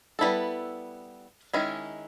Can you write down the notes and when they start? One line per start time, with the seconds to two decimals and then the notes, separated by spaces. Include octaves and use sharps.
0.19 G3 B3 E4 A4
1.53 D#3 G#3 C#4 E4